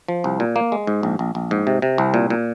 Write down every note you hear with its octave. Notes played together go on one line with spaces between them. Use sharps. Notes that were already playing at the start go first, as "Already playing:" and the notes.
F3
C2
A#2
A#3
G#3
G#2
A#1
A#1
A#1
G#2
C3
C3
C2
A#2
A#2